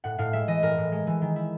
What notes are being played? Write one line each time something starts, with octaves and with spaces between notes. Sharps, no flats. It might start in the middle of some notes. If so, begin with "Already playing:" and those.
A2 F#5
A2 F5
G#3 E5
E3 D#5
A2 A#4
A2
G#3
E3
D#3
E4